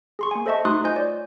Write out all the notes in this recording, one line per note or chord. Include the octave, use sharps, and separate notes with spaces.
G#4 C6 C#6
A#3 G#5
A4 C5 D#5 E5 A5 C#6
A3 D#4 F#4 C6 D#6 F#6
F4 C5 D#5 G#5 G6
C#5 D5